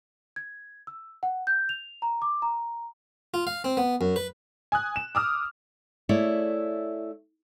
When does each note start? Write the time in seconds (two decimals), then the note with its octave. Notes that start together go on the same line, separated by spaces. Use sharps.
0.36 G#6
0.87 E6
1.23 F#5
1.47 G6
1.69 F7
2.02 A#5
2.22 D6
2.42 A#5
3.34 F4
3.47 F5
3.64 C4
3.77 B3
4.01 F#2
4.16 B4
4.72 G#5 D#6 F#6
4.96 E7
5.15 D6 D#6 F6
6.09 A3 E4 G#4 C#5 D5